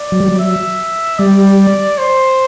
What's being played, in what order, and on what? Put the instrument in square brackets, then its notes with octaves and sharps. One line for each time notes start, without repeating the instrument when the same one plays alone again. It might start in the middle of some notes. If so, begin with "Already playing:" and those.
Already playing: [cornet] D5
[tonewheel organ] F#3
G3
F#3
[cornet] E5
[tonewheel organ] G3 [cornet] D5
[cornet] C5